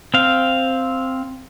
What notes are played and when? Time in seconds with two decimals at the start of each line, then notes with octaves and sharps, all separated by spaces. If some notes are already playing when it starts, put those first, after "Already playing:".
0.14 C4 F5